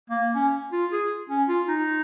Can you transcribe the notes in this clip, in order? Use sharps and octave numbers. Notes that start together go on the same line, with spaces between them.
A#3
C#4
F4
G#4
C#4
F4
D#4